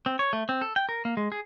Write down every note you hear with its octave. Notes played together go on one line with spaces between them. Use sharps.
C4
C#5
A3
C4
A4
G5
A#4
A#3
G#3
G#4